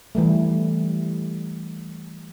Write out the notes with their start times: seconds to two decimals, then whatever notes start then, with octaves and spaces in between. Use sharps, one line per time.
0.15 E3 G3 A3